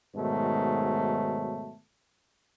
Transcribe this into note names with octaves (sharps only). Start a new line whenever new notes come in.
G#2 B2 D#3 F#3 A3